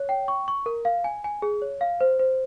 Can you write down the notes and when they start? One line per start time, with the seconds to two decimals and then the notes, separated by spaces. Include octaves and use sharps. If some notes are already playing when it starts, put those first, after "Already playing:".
Already playing: C#5
0.09 G5
0.28 C#6
0.48 C#6
0.66 A#4
0.85 F5
1.04 G#5
1.24 G#5
1.42 G#4
1.62 C#5
1.81 F5
2.01 C5
2.19 C5